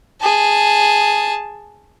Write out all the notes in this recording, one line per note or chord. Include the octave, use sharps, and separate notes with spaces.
G#4 A5